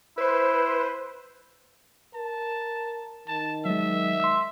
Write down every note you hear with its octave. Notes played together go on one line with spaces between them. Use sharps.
E4 B4 C5
A#4 A5
D#3 A5
F#3 G#3 E5
C6 E6